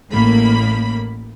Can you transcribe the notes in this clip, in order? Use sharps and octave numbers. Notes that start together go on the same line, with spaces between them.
A1 A2 A#3 B5